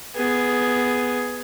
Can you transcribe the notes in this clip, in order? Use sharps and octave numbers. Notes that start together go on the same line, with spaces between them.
B3 G#4